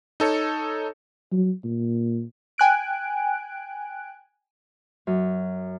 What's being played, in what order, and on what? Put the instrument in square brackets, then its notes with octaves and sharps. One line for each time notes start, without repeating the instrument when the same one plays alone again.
[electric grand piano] D#4 A4 C#5
[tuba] F#3
A#2
[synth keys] G5 G#5 F#6 D7
[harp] F#2